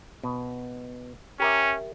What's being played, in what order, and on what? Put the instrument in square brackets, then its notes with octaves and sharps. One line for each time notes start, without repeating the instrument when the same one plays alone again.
[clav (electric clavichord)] B2
[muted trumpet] C#4 [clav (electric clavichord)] G4 A#4 E5